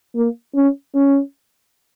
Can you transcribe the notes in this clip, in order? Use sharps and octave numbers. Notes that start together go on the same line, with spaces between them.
A#3
C#4
C#4